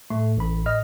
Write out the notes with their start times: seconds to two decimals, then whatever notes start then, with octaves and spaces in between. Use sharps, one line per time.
0.10 A2 A3
0.37 A1 B5
0.66 D#5 F6